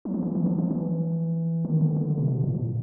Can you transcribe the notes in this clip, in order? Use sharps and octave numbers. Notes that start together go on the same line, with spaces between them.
F#3
F3
E3
E3
F3
F3
E3
D#3
D3
D3
C3
B2
A2
A2